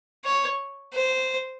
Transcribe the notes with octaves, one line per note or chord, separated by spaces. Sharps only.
C#5
C5